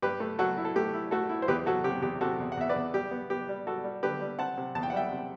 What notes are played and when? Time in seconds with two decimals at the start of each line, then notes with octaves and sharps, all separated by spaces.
0.02 G2 G4 B4
0.20 A3
0.39 F#3 F#4 A4
0.57 E4
0.65 A4
0.76 A3 G4
0.94 E4
1.11 A3 F#4 A4
1.29 E4
1.42 C5
1.48 E2 G4 B4
1.66 F#3 F#4 A4
1.84 C3 G4
2.02 E2 G4
2.21 C3 F#4 A4
2.40 E2
2.52 F#5
2.57 E2 E5
2.69 B4 D5
2.76 E2
2.94 G3 G4
3.11 B3
3.30 B3 G4
3.49 G3
3.67 G3 F#4 A4
3.84 G3
4.03 D3 G4 B4
4.21 G3
4.39 C4 F#5 A5
4.58 C3
4.75 E2 A5
4.83 G5
4.90 F#5
4.93 G3 E5 G5
5.12 C3